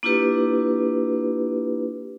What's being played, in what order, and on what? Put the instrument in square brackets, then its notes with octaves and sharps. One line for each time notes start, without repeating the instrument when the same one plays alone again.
[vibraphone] A#3 D4 E4 F4 G4 B4